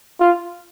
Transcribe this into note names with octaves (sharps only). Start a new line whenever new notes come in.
F4